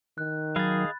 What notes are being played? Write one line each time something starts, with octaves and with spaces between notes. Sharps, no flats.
D#3 F#6
F#3 G#4 D#5 F5 B5 A6